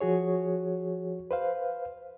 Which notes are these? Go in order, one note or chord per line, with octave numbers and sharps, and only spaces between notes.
F3 F#4 G#4 C#5
B4 C5 F5